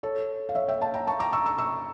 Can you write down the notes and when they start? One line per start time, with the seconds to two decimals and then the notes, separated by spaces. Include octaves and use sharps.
0.03 A4 C#5
0.49 F5
0.55 C#5 E5
0.68 E5 G5
0.81 F5 A5
0.94 G5 A#5
1.07 A5 C#6
1.20 A#5 D6
1.33 C#6 E6
1.45 C#6 E6
1.58 C#6 E6